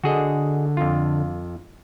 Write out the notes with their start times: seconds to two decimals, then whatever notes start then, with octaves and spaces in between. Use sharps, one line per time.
0.04 D3 F#4 G#4 D#5
0.77 F2 F4